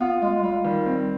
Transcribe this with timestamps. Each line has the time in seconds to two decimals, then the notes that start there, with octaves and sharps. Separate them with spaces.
0.01 B3 F4
0.22 G#3 F4
0.36 G#3
0.43 G3 F4
0.64 D#3 G3
0.86 C4